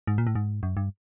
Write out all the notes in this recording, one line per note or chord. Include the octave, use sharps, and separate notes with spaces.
G#2
A#2
A2
G#2
F#2
G2